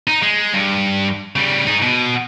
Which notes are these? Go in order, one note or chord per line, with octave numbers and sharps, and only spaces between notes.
D#4
G#3
G2
C#3 G3
D#4 G#4
B2